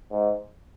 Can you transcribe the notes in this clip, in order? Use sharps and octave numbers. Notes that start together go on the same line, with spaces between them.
G#2